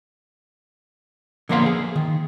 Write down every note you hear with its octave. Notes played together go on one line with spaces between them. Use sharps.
D3 F3 A#3 B3 C5 F5
G#4
D#3